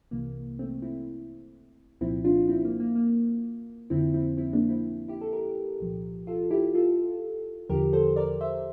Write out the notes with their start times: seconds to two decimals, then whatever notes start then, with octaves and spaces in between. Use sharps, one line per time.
0.11 C2 C3 E3 A#3
0.59 A3 C4
0.82 C4 E4
2.01 C2 A#2 F3 C4 E4
2.25 D4 F4
2.48 C4 E4
2.65 A#3
2.80 A#3
2.95 A#3
3.90 F2 D3 F3 C4 E4
4.14 C4 E4
4.37 C4 E4
4.53 A#3 D4
4.69 C4 E4
5.09 E4 G4
5.21 A4
5.33 G4 A#4
5.80 C2 A#2 F3
6.27 F4 A4
6.51 E4 G4
6.74 F4 A4
7.69 E2 D3 F3 G4 A#4
7.93 A4 C5
8.16 A#4 D5
8.41 C5 E5